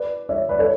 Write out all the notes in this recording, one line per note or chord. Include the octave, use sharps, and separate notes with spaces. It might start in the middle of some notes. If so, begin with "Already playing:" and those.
Already playing: B4 D5
C#5 E5
B4 D5
A4 C#5